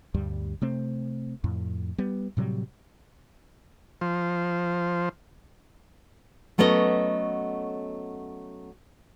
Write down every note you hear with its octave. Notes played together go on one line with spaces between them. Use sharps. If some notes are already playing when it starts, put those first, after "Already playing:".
D2 G2 G3
C3 A3 C4
F2 A2
G3 B3
A2 C3 F#3 G3
F3 C5
F#3 A3 B3 C#4 D5 D#5